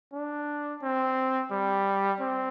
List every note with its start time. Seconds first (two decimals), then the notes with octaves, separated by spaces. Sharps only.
0.13 D4
0.82 C4
1.51 G3
2.20 C4